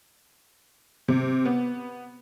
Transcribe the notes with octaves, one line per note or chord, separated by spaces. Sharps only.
C3
B3